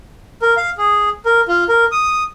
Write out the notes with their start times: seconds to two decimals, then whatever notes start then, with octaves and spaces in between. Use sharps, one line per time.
0.42 A#4
0.57 F5
0.78 G#4
1.26 A#4
1.48 F4
1.69 A#4
1.92 D#6